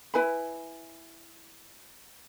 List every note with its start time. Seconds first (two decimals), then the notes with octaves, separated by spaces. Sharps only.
0.14 E4 B4 G#5 B5